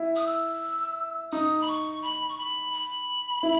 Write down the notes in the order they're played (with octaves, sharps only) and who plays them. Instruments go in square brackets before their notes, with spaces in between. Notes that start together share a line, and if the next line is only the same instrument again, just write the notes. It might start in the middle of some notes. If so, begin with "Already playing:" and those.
Already playing: [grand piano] E4
[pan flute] D#6
E6
[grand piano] D#4 [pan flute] D#6
[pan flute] B5
C#6
B5
C#6
B5
B5
[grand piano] E4